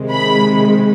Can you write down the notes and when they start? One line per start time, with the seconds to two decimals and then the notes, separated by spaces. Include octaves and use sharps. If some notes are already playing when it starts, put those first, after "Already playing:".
Already playing: C3 D#3 G#3
0.10 B5